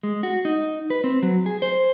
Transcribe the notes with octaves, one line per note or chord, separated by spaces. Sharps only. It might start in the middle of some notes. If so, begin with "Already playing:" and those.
G#3
F#4
D#4
B4
C4
F#3
G#4
C5